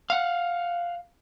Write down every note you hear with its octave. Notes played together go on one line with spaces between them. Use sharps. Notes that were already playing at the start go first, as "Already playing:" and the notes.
F5 F#5